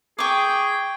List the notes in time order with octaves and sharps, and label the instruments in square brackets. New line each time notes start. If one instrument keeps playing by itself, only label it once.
[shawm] G#4 [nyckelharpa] G5 [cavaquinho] C#6 D6